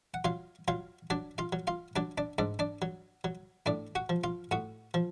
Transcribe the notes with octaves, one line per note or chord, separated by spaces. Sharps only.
F#5
F#3 F4 F5
F#3 F4 F5
F#3 D4 D5
F4 F5
F#3
F4 F5
F#3 D4 D5
D4 D5
G#2 D4 D5
D4 D5
F#3
F#3
A2 D4 D5
F#4 F#5
F3
F4 F5
A2 F#4 F#5
F3